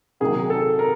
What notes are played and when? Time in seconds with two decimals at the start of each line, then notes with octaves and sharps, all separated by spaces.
0.20 C3 D#3 F#3 A#3 G#4
0.50 A4
0.79 A#4